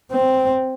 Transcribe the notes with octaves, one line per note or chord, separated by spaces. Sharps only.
C4